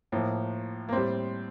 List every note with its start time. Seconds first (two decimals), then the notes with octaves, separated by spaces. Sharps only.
0.12 A2 F3 A#3
0.89 A#3
0.92 A2 G3 C4